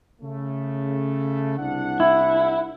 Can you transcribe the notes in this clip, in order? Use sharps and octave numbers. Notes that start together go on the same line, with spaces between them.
C#3 A3
C2 D4 F#5
E4